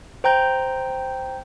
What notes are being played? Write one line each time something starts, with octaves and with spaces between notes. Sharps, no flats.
C5 G5 A#5 G6